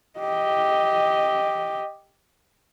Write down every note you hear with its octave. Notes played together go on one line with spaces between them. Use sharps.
G4 D#5